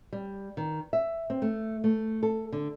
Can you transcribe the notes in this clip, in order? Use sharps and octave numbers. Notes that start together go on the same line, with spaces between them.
G3
D#3
E5
C4
A3
A3
A4
D3